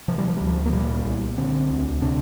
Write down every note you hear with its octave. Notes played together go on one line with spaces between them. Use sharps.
C3 F3
G3
F3
D2 G3
F3
A#3
A#2 G3
C2
D3 C4
D2
C3 D4